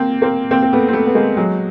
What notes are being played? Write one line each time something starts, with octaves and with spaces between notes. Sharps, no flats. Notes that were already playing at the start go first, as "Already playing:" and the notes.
Already playing: A#3 C4
A#3 C4
A#3 C4
C4
A3 B3
C4
A3 B3
B3
G#3 A#3
F#3 G#3